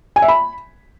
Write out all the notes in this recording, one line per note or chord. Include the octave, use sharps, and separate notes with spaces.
G#5
E5
B5